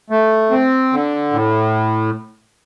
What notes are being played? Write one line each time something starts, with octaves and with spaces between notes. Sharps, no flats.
A3
C4
D3
A2